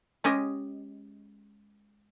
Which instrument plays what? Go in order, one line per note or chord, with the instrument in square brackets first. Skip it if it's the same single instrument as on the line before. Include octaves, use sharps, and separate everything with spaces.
[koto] G#3 C#4 G4 D#5